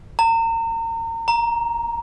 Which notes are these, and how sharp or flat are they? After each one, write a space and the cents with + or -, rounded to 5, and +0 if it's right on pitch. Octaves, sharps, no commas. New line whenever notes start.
A#5 -35
A#5 +5